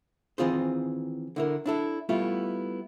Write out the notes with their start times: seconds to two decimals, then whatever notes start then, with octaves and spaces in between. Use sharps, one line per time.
0.38 D#3 E3 C4 F4 G#4 C5
1.36 D3 E4 A#4
1.66 D4 E4 A4
2.09 G3 A3 B3 E4 F4